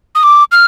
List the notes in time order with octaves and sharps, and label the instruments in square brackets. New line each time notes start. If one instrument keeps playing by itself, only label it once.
[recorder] D#6
D6
F6